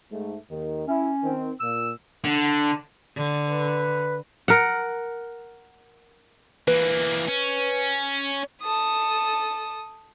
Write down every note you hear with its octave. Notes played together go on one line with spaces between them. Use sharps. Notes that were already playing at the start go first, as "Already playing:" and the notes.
G#2 A3
D#2 D#3
C#4 E4
D#3 C4
A#2 E6
D3
D3
B4
A#4 F#5
E3 A#3 B4
C#4
A4 D#6